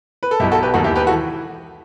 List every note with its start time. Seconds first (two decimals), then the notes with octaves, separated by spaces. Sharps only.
0.23 B4
0.31 A4
0.40 B2 E4 G4
0.43 B1
0.51 F#4 A4
0.62 G4 B4
0.74 E1 D#2 D#3 F#4 A4
0.84 E4 G4
0.96 G4 B4
1.07 E3 F#4 A4